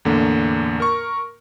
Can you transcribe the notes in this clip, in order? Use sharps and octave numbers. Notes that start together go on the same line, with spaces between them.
E2 A2 D3 A#3
A#4 C#6